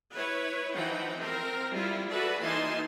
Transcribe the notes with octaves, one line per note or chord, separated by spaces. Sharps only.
E4 B4 C#5
E3 F3 D#4 F#5 G5
C4 A#4
G3 E4 F4
F#4 A4 B4 D5 E5 F#5
E3 A#3 D#4 G#5 A5 C6